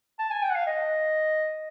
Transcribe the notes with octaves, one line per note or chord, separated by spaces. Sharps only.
A5
G#5
G5
F#5
F5
D#5